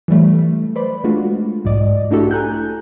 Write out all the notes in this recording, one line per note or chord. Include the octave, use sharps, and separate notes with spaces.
E3 F#3 G3 A3
B4 C5 D5 B5
G#3 A3 D4 F4 F#4
B1 G#2 D5 D#5
A3 D4 E4 F#4 G4 A4
G#5 A#5 F#6 G6